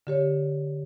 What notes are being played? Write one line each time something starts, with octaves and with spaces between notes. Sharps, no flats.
D3 G4 C#5